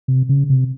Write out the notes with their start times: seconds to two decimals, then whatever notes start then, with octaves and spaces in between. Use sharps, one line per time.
0.08 C3
0.29 C#3
0.50 C3